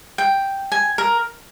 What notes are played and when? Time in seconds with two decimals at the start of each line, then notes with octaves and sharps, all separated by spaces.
0.18 G5
0.72 G#5
0.98 A#4